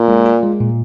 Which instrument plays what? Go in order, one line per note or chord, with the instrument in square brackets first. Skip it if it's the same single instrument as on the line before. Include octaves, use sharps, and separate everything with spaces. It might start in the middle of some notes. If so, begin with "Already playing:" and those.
Already playing: [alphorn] A#2
[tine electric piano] G#3
F4
G#3
A#2